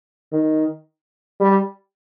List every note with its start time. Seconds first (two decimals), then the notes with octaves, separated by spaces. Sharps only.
0.33 D#3
1.40 G3